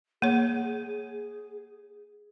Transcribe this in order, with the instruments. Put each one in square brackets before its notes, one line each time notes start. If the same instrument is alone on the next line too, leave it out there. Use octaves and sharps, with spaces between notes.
[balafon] A#3 C#5 [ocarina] G#4